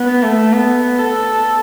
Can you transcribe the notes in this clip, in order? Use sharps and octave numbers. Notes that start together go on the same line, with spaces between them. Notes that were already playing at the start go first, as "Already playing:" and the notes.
Already playing: B3
A3
B3
A4